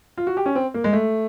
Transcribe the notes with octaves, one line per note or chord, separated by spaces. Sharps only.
F4
F#4
G4
C#4
C4
A#3
G#3
A3